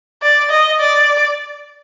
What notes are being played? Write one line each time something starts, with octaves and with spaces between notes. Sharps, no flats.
D5
D#5
D5